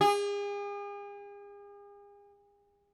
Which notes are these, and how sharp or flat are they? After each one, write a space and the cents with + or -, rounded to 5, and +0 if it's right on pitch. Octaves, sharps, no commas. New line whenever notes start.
G#4 -40